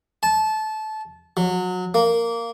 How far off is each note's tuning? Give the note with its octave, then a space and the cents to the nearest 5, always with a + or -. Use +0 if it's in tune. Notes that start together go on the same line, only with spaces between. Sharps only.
A5 -20
F#3 -25
A#3 -10